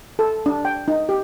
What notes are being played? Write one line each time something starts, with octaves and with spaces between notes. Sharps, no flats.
A4
D4
G5
D#4
G4